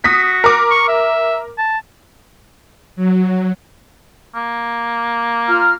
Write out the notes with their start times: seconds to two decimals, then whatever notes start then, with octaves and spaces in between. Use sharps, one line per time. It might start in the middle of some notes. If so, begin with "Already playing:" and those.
0.04 F#4 D#6 B6
0.44 A#4 D6
0.71 C#6
0.88 E5
1.58 A5
2.96 F#3
4.35 A#3
5.48 F4 A#5 F6